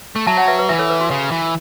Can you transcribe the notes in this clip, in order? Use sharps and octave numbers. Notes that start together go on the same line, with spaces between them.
A3
F#3 E5 A5
C#5 F#5
B4 E5
B4
E3 B4 E5
A4 C#5
B4
F#4
C#3
E3